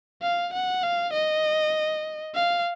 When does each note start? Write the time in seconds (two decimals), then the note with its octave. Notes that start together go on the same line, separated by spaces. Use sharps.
0.22 F5
0.53 F#5
0.83 F5
1.13 D#5
2.35 F5